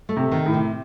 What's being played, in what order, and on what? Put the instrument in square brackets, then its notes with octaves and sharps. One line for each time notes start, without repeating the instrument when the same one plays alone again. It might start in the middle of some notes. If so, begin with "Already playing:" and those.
[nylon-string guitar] A3
[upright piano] C3
[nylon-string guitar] D#3
[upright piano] A2
[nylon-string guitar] C3